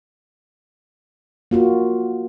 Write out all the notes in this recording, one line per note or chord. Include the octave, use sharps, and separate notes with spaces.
A#3 F4 F#4